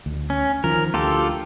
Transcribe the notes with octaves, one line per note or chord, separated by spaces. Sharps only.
D2
C#4
D#3 F3 A#4
D2 F4 G4 A4